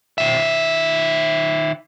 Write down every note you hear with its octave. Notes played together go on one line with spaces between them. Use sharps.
D#3 E5